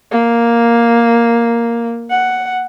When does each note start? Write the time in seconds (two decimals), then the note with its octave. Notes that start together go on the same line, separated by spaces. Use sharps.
0.12 A#3
2.10 F#5